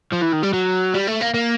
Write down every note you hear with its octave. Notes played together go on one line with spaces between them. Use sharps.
F3
E3
D#3
G3
F#3
G3
A3
A#3
A#3